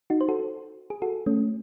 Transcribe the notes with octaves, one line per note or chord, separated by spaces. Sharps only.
D#4 F#4
C5
F#4 A4
G#4
F#4 A4
A3 C#4